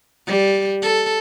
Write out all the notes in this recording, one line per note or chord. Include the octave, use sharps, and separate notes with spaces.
G3
A4